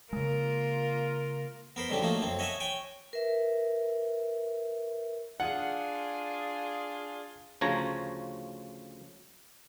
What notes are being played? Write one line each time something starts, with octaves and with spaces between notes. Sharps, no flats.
C#3 G#3 A#3 F4 A#4
B3 A#4 C5 B5
G#2 D3 F#3 C4 G4
F3 F#3 A3 A#3 D#4 F4
F#2 C4
C#5 D#5 E5 F#5 G#5 A5
C#5 G5 G#5
A#4 B4 E5
D4 F4 G#4 F#5
D2 C#3 F3 C#5 A#5